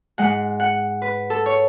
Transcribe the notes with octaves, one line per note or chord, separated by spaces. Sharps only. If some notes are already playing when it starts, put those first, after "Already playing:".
G#2 G#3 F#5
F#5
B4
A4
C#5